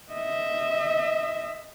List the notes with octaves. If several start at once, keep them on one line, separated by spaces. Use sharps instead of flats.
D#5 E5